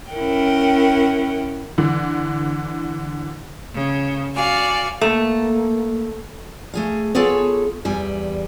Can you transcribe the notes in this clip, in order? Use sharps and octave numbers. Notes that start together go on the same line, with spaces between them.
C#4 E4 A#4 F#5 G5
D3 E3
C#3
F#4 D5 F5 G#5
A3 A#3
A3 G#4 F5
B3 F4 G#4 A4 C#5
E2 G3 G#5